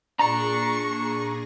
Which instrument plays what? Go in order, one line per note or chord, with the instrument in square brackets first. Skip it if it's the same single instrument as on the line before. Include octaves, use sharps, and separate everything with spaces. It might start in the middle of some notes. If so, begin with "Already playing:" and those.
[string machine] A#2 G#4 A#6 [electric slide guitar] D4 [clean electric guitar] A#5 [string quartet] C#6